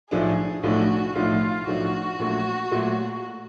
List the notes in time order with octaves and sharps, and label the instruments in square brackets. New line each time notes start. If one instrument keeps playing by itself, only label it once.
[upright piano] B1 A2 F3 A3 D4 [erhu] G#4
[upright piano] B1 A2 F3 A3 D4 [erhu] F#4
[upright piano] B1 A2 F3 A3 D4 [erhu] F4
[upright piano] B1 A2 F3 A3 D4 [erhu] F#4
[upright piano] A#1 A#2 F#3 A3
A#2 F#3 A3